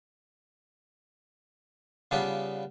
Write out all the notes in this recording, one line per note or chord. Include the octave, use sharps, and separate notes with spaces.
C#3 G3 B3 D4 F4 B4